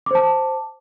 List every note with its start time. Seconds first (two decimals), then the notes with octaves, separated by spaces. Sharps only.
0.06 D6
0.11 C5
0.15 A5